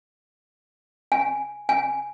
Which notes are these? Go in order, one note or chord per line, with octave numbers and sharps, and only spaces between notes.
G#5
G#5